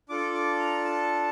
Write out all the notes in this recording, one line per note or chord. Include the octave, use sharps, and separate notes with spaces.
D4 F4 A4 D6
D6
A#5
A5